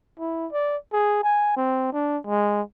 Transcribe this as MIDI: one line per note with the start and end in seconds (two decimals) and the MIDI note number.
0.19 0.47 64
0.52 0.77 74
0.93 1.20 68
1.23 1.53 80
1.56 1.89 60
1.93 2.18 62
2.27 2.62 56